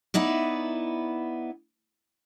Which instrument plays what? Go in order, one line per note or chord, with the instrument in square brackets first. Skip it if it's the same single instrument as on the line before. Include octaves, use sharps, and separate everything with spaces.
[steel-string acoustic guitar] B3 D#4 E4 D5